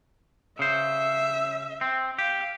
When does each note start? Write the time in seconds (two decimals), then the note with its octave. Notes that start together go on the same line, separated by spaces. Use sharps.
0.59 C#3 C5 E5
1.81 C4
2.19 G4 F5